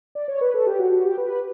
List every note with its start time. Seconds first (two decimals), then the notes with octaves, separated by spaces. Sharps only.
0.15 D5
0.28 C#5
0.41 B4
0.54 A4
0.66 G4
0.79 F#4
0.91 F#4
1.04 G4
1.17 B4